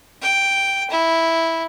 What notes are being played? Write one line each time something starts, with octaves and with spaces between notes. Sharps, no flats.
G5
E4